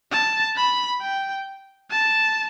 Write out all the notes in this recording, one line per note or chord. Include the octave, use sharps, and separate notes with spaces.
A5
B5
G5
A5